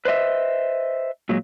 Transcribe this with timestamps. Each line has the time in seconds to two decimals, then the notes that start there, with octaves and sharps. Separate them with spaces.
0.05 B4 C5 D#5 E5
1.29 A#2 F#3 G#3